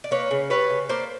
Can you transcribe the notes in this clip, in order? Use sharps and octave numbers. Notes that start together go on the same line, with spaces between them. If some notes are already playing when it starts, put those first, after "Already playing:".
D5
A#3 B4 C#5
C#3
G3 B4 C#5
C#3
A#3 C5 D5